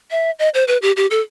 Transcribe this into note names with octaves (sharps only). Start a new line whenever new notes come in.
E5
D#5
C5
B4
G4
G4
A4